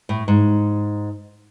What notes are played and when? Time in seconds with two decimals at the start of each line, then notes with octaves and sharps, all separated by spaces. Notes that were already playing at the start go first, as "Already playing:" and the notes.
0.09 A2
0.28 G#2